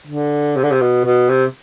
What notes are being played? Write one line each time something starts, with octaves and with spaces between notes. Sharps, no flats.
D3
C3
D3
C3
B2
B2
C3